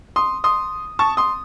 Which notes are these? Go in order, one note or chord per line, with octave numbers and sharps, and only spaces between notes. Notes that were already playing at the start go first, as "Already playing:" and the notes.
C6 D#6
C6 D#6
A5 C#6
C6 D#6